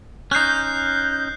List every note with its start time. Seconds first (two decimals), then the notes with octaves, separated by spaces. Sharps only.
0.31 C#4 D#4 F#6 G6 C7